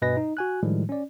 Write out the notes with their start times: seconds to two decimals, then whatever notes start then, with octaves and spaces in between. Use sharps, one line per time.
0.02 G2 B2 B4 D#5 G#5 A#6
0.17 D#4
0.37 F#4 G#5 F#6
0.63 A2 D#3 F3 G3 G#3
0.89 C#4 D5